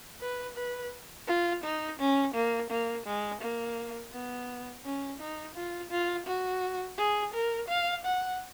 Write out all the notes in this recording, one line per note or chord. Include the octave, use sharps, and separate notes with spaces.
B4
B4
F4
D#4
C#4
A#3
A#3
G#3
A#3
B3
C#4
D#4
F4
F4
F#4
G#4
A#4
F5
F#5